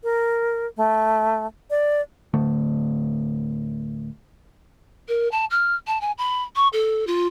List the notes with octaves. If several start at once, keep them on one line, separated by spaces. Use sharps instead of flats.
A#4
A3
D5
D1 D3 A3
A#4
A5
F6
A5
G#5
B5
C#6
A4
F4